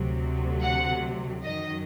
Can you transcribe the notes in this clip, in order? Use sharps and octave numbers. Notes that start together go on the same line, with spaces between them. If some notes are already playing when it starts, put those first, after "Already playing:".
Already playing: D2 C3 F#3
F#5
F#2 D#3 F#3 D#5